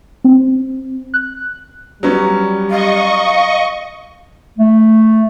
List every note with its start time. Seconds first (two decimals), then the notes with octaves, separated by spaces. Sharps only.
0.24 C4
1.14 F#6
2.03 F#3 G3 B3 C#4
2.70 D#5 F5 C#6
4.58 A3